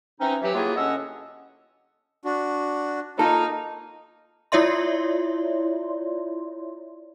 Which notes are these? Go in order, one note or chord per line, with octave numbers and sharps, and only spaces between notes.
E3 C4 C#4 D#4
E3 F#3 G4
F#3 G3 A#3 E4 F4 G#4
A2 D3 C#4 D#5 F#5 E6
D4 F#4
A#3 D#4 F4 A4 F6
E4 F4 C#5 D5 E5 C6